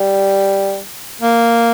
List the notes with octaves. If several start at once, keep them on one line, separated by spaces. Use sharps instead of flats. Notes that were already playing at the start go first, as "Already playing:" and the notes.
Already playing: G3
A#3